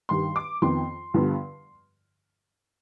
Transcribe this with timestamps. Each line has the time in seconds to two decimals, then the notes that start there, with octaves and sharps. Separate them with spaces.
0.09 G2 D#3 G3 C6
0.36 D6
0.62 F2 D#3 B3 C6
1.14 G2 D3 F3 B3